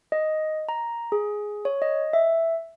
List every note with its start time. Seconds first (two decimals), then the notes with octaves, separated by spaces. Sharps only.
0.12 D#5
0.69 A#5
1.12 G#4
1.65 C#5
1.82 D#5
2.13 E5